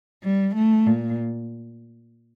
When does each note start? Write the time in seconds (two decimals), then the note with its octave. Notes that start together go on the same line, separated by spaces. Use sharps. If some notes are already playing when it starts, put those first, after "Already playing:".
0.23 G3
0.55 A3
0.86 A#2